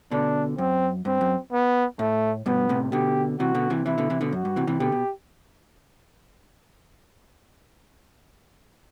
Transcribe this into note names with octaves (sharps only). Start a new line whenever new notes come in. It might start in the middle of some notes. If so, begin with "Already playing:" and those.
B2 D3 D4
F#2 C4
G2 C4
F#2
B3
A2 A3
G2 B2 B3
A2 C3
B2 D3 G4
C3 E3 F#4
B2 D3
C3 E3
C3 E3 E4
B2 D3
C3 E3
B2 D3
F#2 F#4
G2
C3 E3
C3 E3
B2 D3 G4
B2